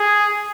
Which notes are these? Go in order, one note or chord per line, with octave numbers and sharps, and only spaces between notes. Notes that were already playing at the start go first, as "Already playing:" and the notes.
Already playing: G#4